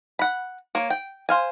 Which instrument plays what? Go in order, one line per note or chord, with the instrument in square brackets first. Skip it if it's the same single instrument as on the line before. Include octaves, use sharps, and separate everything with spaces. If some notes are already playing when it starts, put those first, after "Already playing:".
[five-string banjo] F#5 B5
A#3 C#5
G5
C5 F5 G#5